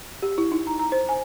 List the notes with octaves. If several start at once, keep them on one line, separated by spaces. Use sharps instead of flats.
G4
E4
D#4
A#5
A#5
C5
G#5